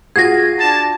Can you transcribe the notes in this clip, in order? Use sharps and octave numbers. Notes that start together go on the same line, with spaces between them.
F4 F#4 G#4 G#6 A#6
D4 A5